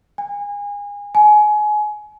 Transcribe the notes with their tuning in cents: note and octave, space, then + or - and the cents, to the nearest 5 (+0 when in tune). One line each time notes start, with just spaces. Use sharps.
G#5 -30
G#5 +25